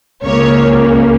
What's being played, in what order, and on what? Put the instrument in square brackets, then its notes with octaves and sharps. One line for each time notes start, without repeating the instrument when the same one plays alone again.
[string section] C#2 C#3 A#3 C#5